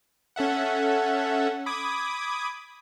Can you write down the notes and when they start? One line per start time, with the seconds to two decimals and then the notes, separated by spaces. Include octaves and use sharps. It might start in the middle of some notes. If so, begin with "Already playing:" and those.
0.36 C#4 A4 E5 F#5
1.66 B5 D6 D#6 G#6